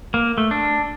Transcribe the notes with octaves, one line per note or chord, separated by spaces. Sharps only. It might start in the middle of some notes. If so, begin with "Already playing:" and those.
A#3
A3
D4